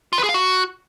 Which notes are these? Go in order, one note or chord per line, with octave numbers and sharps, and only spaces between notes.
F4
B4
G#4
F5
F#4